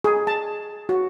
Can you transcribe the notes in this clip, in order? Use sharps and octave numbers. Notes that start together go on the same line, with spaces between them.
G#4
A5
F#4